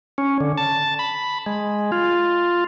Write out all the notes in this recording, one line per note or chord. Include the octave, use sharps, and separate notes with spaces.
C#4
D3
A5
B5
G#3
F4